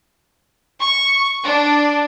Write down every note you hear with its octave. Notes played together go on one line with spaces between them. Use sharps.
C#6
D4